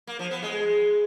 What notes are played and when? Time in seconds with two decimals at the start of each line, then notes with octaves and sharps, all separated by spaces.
0.07 A#3
0.19 F3
0.31 B3
0.43 G#3